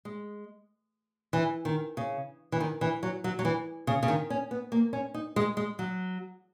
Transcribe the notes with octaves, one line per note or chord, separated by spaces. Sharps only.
G#3
E3
D#3
C#3
E3
D#3
E3
F#3
F#3
F#3
E3
C#3
C#3
D#3
C#4
B3
A#3
C#4
D#4
G#3
G#3
F#3